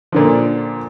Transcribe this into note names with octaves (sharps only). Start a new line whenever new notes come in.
A#2 D3 F3